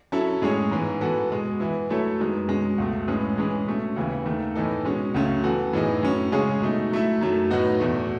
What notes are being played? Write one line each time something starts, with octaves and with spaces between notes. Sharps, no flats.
F#3 C#4 E4 A4
A2 G#3 C#4 G#4 C#5
G#2 E3 B3
E3 B3 F#4 A4
B2 G#3 B3
E3 B3 E4
F#3 A3 E4 A4 C#5
F#2 D#3 G#3 B3
B2 G#3 C#4
C#2 B2 A3
A2 G#3 C#4 G#4 B4
E3 G#3 C#4 G#4 B4
B2 A3 C#4
D#2 C#3 E3 B3 E4
D#2 D#3 A3
A2 E3 B3 D#4 A4
B2 G#3 C#4
C#2 C#3 F#3 A3 C#4
E3 B3 F#4 A4
A2 E3 B3 D#4 G#4
A2 F#3 C#4
C#3 G#3 C#4 G#4 C#5
B2 A3 D#4
F#3 A3 E4
F#2 D#3 F#3 A3
A2 F#3 B3 D#4 F#4
E2 B2 A3